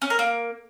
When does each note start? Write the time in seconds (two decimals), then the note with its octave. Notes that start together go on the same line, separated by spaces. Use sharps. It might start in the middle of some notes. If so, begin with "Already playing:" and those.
0.02 C#4
0.10 A#4
0.19 A#3